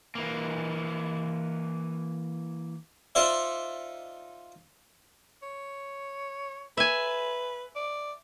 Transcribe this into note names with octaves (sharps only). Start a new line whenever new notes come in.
E3 A#3
D#4 F4 C5 D5 E5
C#5
B4 E5 G#5
D5